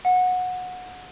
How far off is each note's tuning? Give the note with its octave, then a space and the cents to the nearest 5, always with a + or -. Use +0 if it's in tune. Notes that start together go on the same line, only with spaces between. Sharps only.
F#5 -20